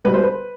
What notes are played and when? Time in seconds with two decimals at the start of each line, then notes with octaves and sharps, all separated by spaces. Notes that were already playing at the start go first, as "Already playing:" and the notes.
0.04 B2 G3 B4
0.14 C5
0.24 B4